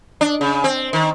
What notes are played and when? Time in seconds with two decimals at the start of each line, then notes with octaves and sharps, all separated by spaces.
0.21 D4
0.41 C#3
0.64 C4
0.93 D#3